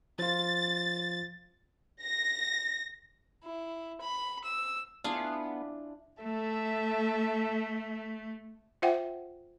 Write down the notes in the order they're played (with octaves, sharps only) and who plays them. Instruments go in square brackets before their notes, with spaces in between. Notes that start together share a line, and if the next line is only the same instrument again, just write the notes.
[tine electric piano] F3 F4 [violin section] A6
[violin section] A#6
[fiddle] E4
B5
E6
[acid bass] B3 [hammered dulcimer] D4 E4 D5 [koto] F4 G#4
[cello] A3 [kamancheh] A4 E5
[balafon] F4 C5 E5 F#5 G5